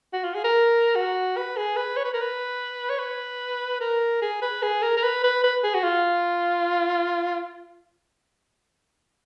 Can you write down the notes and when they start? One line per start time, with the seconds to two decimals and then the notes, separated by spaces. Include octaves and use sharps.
0.13 F#4
0.24 F4
0.34 G#4
0.44 A#4
0.95 F#4
1.37 B4
1.57 G#4
1.76 B4
1.97 C#5
2.05 B4
2.13 A#4
2.21 B4
2.89 C#5
2.99 B4
3.80 A#4
4.22 G#4
4.42 B4
4.63 G#4
4.82 A#4
4.97 A#4
5.03 B4
5.24 B4
5.44 B4
5.64 G#4
5.75 F#4
5.84 F4